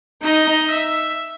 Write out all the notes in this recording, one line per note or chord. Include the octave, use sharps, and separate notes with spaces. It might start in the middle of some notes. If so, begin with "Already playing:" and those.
D#4 D#5
E5